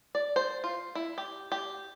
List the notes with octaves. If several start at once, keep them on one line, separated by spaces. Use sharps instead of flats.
D5
C5
F4
E4
G4
G4